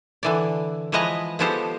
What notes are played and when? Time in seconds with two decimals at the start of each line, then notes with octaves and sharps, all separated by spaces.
0.23 D3 E3 D5
0.92 E3 F3 G#3 B4 D#5 A#5
1.39 F3 G#3 B3 G4 A4 C5